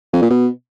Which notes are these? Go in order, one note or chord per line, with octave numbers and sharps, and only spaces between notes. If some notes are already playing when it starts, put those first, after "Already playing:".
F2
A#2
B2